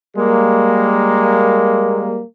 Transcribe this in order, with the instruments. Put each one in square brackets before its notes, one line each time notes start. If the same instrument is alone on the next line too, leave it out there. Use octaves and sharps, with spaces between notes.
[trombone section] G3 G#3 A#3